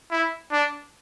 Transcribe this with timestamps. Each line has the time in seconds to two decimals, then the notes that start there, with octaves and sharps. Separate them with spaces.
0.11 E4
0.52 D4